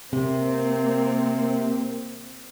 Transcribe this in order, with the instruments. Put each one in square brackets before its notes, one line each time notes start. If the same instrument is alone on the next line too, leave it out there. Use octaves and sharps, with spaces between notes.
[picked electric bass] C3 [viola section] A#3 C4